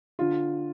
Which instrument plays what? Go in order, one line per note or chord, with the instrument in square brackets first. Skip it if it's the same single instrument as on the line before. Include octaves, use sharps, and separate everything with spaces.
[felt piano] D3 F4